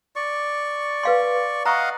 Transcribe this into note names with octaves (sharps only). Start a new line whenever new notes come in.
D5 C#6
B4 F5 C6
D#5 F5 F#5 A#5 C#6